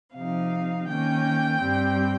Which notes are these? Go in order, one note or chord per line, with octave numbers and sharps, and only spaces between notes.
C3 F3 C4 D#4 F5
D#3 A#3 C#4 G5
G2 G3 C4